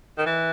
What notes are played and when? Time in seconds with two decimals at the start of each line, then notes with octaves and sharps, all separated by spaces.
0.18 D#3
0.26 E3